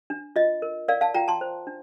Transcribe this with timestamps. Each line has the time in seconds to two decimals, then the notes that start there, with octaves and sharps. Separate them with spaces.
0.10 D4
0.36 F4 D#5
0.62 A#4
0.88 A#4 D5 F5
1.01 F5 A5
1.14 F4 G5 A#5
1.28 A5 C6
1.41 C5
1.67 D4